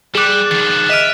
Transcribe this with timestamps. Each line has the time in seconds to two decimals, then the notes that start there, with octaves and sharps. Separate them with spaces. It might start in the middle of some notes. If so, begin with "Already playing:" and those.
0.15 G3 G#4 D6 F#6 E7
0.51 D#3 F3 A6
0.89 D#5 E5 F6 D7 D#7 F7